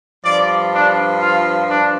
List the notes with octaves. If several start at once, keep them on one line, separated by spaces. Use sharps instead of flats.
G2 F3 D5
D4
F4
D4